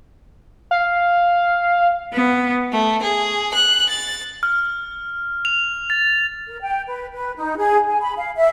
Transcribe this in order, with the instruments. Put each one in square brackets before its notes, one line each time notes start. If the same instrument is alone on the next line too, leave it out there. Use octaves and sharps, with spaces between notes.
[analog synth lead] F5
[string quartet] B3
A3
G#4
F#6
A6
[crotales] F6
F7
A6
[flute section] A#4
G5
B4
B4
D#4
G#4
G#5
B5
F5
E5